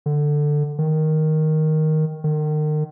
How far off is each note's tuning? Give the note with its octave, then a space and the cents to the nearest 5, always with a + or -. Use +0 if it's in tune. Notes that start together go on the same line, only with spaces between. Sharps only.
D3 +10
D#3 +5
D#3 -35